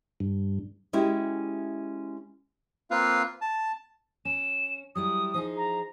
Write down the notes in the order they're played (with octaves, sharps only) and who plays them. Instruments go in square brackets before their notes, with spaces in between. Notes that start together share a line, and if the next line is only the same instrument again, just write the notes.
[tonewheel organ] G2
[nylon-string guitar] G#3 C#4 E4 F#4 G4
[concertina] A#3 C4 F4 B4 F5
A5
[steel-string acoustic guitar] C#4 [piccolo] E7
[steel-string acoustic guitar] F#3 G3 E4 [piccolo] D#6
[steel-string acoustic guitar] F3 D#4 G#4
[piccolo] A#5